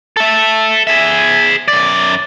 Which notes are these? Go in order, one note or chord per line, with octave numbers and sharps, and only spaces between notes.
A4 E5
G#4 E5
F#2 D5